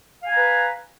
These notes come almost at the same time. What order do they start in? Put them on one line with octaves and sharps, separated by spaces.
F5 G#5 A#5 B4